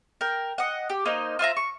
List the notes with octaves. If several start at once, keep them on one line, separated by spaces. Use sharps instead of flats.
A#4 G5
D#5 F#5
G4
A#3 D#4 C5
F4 C5 E5 A#5
C#6